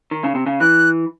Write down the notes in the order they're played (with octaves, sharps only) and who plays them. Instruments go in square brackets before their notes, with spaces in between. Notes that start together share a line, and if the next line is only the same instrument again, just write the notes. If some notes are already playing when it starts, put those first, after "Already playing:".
[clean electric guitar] D#3
C#3
C3
C#3
[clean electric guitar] E3 [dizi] F#6